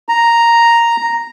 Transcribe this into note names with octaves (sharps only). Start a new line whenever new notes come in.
A#5